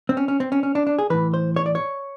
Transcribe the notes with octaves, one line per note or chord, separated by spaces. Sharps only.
C4
C#4
C#4
C4
C#4
C#4
D4
D4
G#4
A2 E3 B4
C5
C#5
D5
C#5